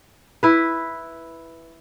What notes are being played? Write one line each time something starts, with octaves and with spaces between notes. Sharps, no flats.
E4 B4